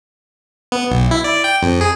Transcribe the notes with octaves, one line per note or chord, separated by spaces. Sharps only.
B3
B1
E4
D5
G5
F2
G#4